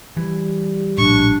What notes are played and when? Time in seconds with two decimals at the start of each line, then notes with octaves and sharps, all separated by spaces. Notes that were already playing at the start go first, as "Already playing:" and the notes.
0.17 E3 G3
0.98 A#1 A2 D4 C#6